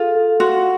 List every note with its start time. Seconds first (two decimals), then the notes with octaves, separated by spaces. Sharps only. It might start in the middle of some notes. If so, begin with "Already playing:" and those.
Already playing: F4 G#4 A4
0.15 A4
0.40 F#4 C6